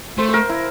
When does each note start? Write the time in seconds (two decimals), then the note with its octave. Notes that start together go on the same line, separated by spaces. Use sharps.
0.18 A3 C5
0.29 A#4 C5
0.49 E4